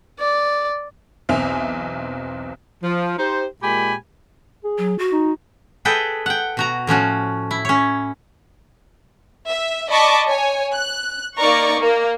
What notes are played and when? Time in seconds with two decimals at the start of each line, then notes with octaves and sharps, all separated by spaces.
0.19 D5
1.29 B1 E2 C4 E5 G#5 F7
2.82 F3
3.18 D#4 G4 C5
3.62 A#2 G#3 G4 G#5 B5
4.64 G#4
4.78 F#3
4.99 F#4
5.12 D#4
5.85 G#4 A4 B4 D#5 G5
6.26 F#5 G5
6.57 B2 F#4 A#5
6.87 A2 F3 C#4 F#4
7.51 E4
7.65 C#4 C#5
9.47 E5
9.91 D5 D#5 A5 B5 C#6 D6
10.28 C#5 G#5
10.73 F#6
11.38 A#3 D#4 A#4 D5 A#5 C#6
11.79 A#3 A#4